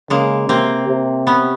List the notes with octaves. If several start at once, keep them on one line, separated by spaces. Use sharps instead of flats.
C#3 G#3 A#3
C3 A#3 C4
C3
B3 C#4